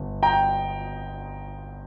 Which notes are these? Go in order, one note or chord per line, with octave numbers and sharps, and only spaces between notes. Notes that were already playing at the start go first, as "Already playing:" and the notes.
Already playing: G1
G5 A#5